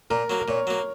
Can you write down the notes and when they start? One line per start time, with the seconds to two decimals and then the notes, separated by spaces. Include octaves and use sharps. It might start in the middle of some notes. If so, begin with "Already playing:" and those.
0.10 A#2 A#4
0.30 F#3 A#3
0.40 A#4
0.48 A#2 C#5
0.67 F#3 A#3